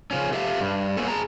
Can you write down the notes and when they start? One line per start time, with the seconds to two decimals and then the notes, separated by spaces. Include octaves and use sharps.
0.11 C#3 F3 C#4
0.32 G4 A4 E5 F5
0.60 G2
0.97 A#3 B3 C#4 A4
1.08 G#4 A5 A#5